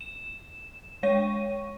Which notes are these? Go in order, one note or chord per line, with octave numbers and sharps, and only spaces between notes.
E7
G#3 C#5 C#6 D#7